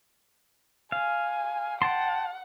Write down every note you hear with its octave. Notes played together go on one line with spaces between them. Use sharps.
F5 G#5
F#5 G5 A5 C6